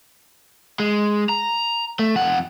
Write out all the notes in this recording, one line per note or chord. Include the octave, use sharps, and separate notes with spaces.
G#3
A#5
A3
F2 F#5